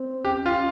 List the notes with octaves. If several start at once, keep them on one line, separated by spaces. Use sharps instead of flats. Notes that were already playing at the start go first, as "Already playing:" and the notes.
Already playing: C4
C#4 G4
F4